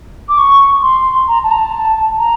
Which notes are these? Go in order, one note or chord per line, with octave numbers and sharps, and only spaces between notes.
D6
C#6
C6
A#5
A5
A#5
A5
A#5